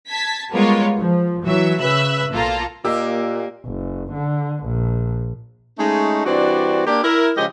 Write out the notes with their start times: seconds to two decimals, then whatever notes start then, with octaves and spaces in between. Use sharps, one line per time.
0.10 A5 G#6 B6
0.51 G3 G#3 B3 F4 A#4 C#5
0.98 F3
1.44 E3 F#3 E5
1.80 C#3 B4 E5 E6 F#6
2.31 B1 A#3 F4 A4 A#5
2.85 A#2 A#3 G4 D#5 D6 E6
3.66 F#1
4.13 D3
4.65 A#1
5.79 G#3 A3 C#4 D#4
6.26 G2 E3 C4 D4 F#4 D5
6.87 A#3 D4 G4
7.04 E4 A#4
7.37 C#3 F3 G#3 G4 D#5